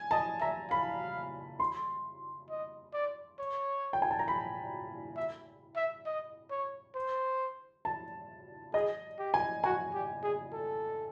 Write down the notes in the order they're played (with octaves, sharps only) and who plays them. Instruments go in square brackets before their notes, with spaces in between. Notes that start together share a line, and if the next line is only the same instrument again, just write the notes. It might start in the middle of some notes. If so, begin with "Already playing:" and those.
Already playing: [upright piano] G#5
[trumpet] D#5 [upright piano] A5
[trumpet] E5 [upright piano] A#5
[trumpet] F5 [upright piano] B5
[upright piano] C6
[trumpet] D#5
D5
C#5
[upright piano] G5
G#5
A5
A#5
B5
[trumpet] E5
E5
D#5
C#5
C5
[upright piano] A5
[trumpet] G#4 [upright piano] D#5
[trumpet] G4
[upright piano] G#5
[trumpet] F#4 [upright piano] G#5
[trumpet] G4
G#4
A4